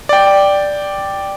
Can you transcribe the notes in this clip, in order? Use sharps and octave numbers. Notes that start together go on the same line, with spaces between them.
D5 G5